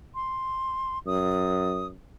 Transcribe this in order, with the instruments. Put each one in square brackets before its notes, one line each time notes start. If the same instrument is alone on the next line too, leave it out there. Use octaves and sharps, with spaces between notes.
[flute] C6
[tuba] F#2 [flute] D#6